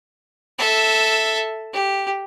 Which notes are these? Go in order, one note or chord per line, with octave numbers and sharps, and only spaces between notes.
A4 E5
G4